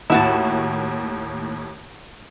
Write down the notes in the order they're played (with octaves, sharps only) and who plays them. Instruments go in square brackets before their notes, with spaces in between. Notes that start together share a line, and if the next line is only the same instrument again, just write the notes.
[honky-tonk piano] D#2 A2 [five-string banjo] E4 F#4 A5